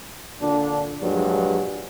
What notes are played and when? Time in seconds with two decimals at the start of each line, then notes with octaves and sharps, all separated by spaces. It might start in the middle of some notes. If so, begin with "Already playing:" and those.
0.41 A#2 D3 D4
1.01 A#1 G2 F#3 G#3